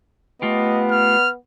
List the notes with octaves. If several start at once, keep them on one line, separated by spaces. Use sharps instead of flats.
A3 B3 F4 G4 D#5
F6